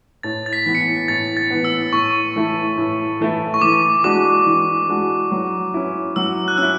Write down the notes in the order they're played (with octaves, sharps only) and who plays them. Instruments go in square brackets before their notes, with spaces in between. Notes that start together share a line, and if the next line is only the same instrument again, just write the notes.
[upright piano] A2 [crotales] A6
[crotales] A6
B6
[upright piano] E3 B3
[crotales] C#7
B6
[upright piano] A2 [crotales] A6
[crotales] A6
[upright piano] E3 B3
[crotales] E6
[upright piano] A2 [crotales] C#6
[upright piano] E3 A3 E4
A2
E3 A3 E4
[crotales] C#6
[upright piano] E3 [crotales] D6
[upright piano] G#3 D4 F#4 [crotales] D6
[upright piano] E3
G#3 D4 F#4
F#3
C#4 E4
[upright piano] F#3 [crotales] E6
[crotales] F#6
[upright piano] C#4 E4 [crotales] E6